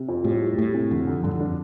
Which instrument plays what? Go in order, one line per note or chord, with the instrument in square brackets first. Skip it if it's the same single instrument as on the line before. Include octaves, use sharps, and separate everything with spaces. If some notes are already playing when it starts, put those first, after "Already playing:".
Already playing: [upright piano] C3
F2
[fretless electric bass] A2 [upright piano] G3
[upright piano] G3
[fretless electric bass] A2 [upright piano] G3
[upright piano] C3
[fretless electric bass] F2 [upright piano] D3
[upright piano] D3
[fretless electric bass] G2 [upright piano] D3
[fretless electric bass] F2
[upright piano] D4